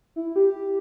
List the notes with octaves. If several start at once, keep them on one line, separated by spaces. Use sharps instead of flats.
E4
G4